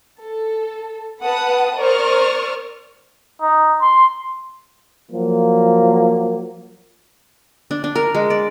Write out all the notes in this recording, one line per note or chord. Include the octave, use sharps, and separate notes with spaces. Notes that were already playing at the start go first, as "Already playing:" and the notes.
A4
B4 F#5 A5 D#6
A#4 C5 D5 C#6 D#6 F6
D#4
C6
F3 F#3 A#3
D4
D4
A#4
G#3
D5